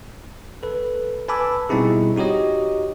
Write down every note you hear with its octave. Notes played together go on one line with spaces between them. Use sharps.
A4 B4
B4 G#5 A5 B5 D6 E6
B2 G3 C4 D#4 E4 G#4
D#4 F#4 G4 C#5 D#5